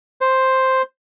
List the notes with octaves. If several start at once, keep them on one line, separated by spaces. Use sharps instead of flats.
C5